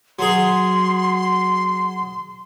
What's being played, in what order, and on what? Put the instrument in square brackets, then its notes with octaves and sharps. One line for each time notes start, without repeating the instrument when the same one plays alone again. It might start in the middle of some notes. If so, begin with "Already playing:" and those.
[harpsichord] F#3 G#4 [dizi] C6